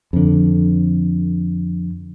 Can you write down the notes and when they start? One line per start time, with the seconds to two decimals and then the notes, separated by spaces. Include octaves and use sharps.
0.13 F2 D3